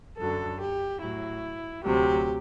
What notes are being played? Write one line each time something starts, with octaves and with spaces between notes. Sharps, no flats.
F#2 D3 F#3 A4
G4
A2 F#3 E4
D2 C3 F#3 G4